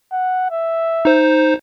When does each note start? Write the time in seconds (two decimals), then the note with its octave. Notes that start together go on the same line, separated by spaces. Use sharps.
0.12 F#5
0.51 E5
1.05 D#4 C5